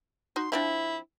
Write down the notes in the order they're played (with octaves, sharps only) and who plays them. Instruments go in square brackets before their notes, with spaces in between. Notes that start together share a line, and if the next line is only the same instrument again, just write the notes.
[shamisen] D#4 F#4 [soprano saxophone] C6
[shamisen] F3 C4 D4 [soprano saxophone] E4